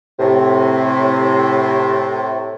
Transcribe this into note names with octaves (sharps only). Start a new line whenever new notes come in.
A2 C3